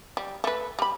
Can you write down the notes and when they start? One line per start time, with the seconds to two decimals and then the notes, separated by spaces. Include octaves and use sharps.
0.17 G3
0.44 A3 B4
0.79 G3 B5